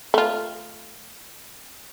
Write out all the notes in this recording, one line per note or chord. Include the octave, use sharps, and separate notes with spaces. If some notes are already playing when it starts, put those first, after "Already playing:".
A3 F4